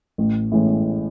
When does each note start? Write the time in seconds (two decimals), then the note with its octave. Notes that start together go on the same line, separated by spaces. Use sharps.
0.18 A1
0.52 A2 E3 G#3 C#4